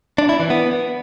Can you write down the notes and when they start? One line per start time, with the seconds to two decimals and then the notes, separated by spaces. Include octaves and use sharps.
0.18 D4
0.29 E4
0.40 E3
0.50 B3